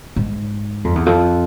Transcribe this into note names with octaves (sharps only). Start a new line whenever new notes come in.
G#2
F2
E2
F2